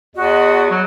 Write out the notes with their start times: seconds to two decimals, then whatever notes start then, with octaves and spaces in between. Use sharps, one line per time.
0.16 E2 F#4 D#5
0.71 F#3